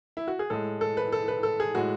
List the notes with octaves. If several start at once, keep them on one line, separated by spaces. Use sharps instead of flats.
E4
F#4
G#4
A2 G#3 A4
A4
B4
A4
B4
A4
G#4
A2 G#3 F#4